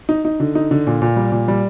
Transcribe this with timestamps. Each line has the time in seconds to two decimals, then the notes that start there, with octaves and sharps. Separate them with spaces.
0.09 D#4
0.25 D#4
0.40 D3
0.55 D#4
0.71 D3
0.87 A#2
1.02 A#2
1.16 G3
1.32 A#2
1.48 G3